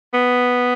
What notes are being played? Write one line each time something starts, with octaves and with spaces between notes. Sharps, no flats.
B3